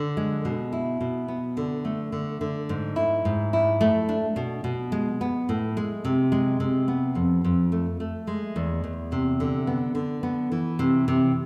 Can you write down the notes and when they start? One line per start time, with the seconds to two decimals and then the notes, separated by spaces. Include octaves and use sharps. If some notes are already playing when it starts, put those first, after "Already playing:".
Already playing: D3
0.17 G#3
0.45 B2
0.73 E4
1.01 B2
1.28 B3
1.57 D3
1.85 A3
2.12 D3
2.41 D3
2.69 G#2
2.96 E4
3.25 G#2
3.53 E4
3.81 A3
4.09 D4
4.36 B2
4.64 B2
4.92 G#3
5.21 B3
5.49 A2
5.77 G#3
6.05 C3
6.32 G#3
6.60 C3
6.88 B3
7.15 F2
7.44 F2
7.72 A3
8.00 A3
8.27 G#3
8.56 E2
8.84 E2
9.12 C3
9.40 D3
9.67 B3
9.95 D3
10.23 B3
10.52 E3
10.79 C3
11.08 C3